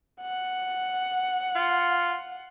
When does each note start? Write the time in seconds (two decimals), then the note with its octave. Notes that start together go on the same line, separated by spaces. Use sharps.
0.21 F#5
1.56 F4